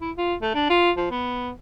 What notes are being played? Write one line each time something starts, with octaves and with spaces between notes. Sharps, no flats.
E4
F4
A3
D4
F4
F3
B3